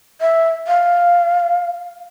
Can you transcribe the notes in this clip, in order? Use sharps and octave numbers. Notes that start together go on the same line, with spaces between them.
E5
F5